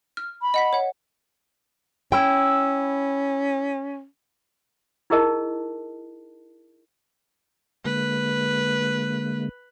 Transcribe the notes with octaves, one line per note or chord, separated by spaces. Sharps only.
F6
B5
D#5 F#5 B6
C#5 F#5
C#4 E4 G5
D#4 E4 G#4 A#4 D#5 A5
D3 G#3 A#3 B4